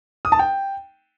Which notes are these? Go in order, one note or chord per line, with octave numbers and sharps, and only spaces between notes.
D#6
A5
G5